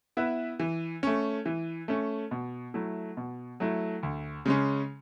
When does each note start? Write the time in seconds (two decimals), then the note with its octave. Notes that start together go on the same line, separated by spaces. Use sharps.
0.17 B3 E4 B4 E5
0.60 E3
1.03 A3 C#4
1.46 E3
1.88 A3 C#4
2.31 B2
2.74 F#3 A3 E4
3.17 B2
3.60 F#3 A3 E4
4.03 D2
4.46 C#3 G#3 C#4